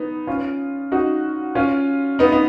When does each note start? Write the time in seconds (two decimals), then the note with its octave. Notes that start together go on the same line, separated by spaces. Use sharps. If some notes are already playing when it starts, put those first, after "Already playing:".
Already playing: B3 D#4
0.27 C#4 F4
0.92 D#4 F#4
1.55 C#4 F4
2.19 B3 D#4
2.32 B3